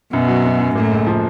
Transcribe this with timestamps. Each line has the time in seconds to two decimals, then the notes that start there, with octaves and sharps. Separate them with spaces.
0.13 F#2 B2
0.28 F#3
0.45 F#2
0.60 F#2
0.75 A2 A#3
0.92 C#2
1.07 F3